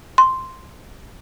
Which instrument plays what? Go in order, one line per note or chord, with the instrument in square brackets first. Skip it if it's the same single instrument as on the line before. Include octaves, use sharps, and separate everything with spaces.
[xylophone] C6